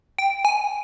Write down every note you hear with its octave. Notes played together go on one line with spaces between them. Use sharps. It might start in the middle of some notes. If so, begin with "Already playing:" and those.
G5
G#5